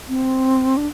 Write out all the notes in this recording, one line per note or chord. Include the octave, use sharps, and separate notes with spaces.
C4
D4